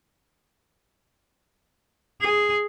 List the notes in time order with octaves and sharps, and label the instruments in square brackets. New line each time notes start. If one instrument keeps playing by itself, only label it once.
[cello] G#4